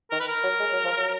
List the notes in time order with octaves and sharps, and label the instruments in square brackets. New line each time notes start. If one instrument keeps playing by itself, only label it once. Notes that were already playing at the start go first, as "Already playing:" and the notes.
[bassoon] D#3 [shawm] A#4
[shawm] B4
A#4
[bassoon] F#3
G#3
F#3
F3
F#3